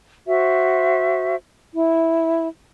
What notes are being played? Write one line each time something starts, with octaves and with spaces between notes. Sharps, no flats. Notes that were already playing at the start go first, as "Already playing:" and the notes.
F#4 C5 E5
E4